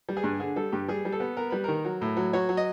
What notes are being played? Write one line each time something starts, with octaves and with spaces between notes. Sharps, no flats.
G3
G#4
G2
D3 G#4
G3 A4
G2 G4
G3 G#4
G3
A4
B3
B3 A#4
G3 B4
D#3 A#4
F#3
A2
F#3
F#3 C#5
F#3
D#5